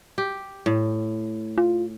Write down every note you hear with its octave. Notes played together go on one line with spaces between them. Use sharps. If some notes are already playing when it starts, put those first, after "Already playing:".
G4
A2
F4